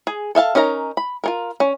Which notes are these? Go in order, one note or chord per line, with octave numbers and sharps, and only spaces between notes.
G#4
A4 E5 F5 A5
C#4 D#4 A#4 E5 A#5
B5
F4 A4 A#4
C#4